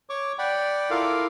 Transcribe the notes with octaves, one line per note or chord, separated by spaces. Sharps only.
C#5 C#6 D6
D5 F#5 G5 B5
E4 F4 A4 A#4 F5 D6